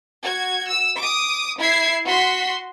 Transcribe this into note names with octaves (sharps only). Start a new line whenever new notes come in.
F#4 G#6
E6
D6 D#6
E4 G#6 C7
F#4 C6 B6